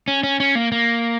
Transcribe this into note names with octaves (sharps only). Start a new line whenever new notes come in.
C#4
C#4
C#4
A#3
A#3